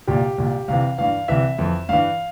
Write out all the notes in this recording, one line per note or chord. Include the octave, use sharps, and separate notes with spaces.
C2 A#2 G4
C2 A#2
C2 C3 E3 F5
G2 E3 F5
C2 C3 E3 E5
F2 E3
G2 E3 F5